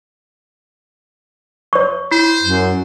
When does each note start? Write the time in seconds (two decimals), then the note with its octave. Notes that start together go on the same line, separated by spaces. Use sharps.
1.73 C#5 C#6
2.11 E4 C5
2.43 F#2